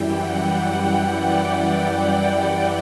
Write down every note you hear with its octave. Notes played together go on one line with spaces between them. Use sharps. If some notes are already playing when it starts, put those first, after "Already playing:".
Already playing: F#2 E3 G3 G5
F#5
D5
F#5